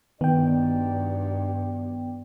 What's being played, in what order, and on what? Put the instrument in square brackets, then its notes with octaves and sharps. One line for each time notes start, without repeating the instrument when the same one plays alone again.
[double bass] G2 [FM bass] D#3 [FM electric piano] B3 G5 [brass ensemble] D#4 F#4 D5